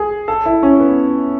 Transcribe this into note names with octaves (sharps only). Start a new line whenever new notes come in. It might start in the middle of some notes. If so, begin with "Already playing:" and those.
Already playing: G#4
A4
E4
C#4
B3